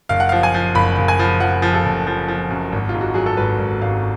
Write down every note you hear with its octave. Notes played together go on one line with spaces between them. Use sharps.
F#1 F5
F#5
F3 F5
G#5
F3
F#1 B5
F#1
G#5
F3
F3 F#5
F3
A4
F#1
F3
F3
F#2
G#1
F4
G#2
F#4
F#3 G#4
A4
G#1 B4
G#1
G#1 F5